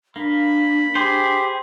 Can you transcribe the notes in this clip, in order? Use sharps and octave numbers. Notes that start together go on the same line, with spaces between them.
A#3 D4 B5
G4 G#4 C5